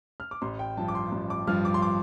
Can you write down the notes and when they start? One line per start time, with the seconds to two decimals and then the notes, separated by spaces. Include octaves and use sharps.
0.20 F6
0.31 D6
0.42 A1 C6
0.59 G5
0.77 G2 F3 A5
0.88 D6
0.95 C6
1.12 A1
1.30 D6
1.47 G2 F3 F6
1.65 D6
1.74 C6
1.82 D6